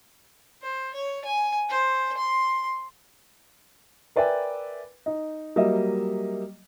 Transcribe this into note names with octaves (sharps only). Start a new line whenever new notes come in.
C5
C#5
G#5
C5
C6
A#4 B4 D5 E5 G5 G#5
D#4
F#3 G3 A#3 D#5 E5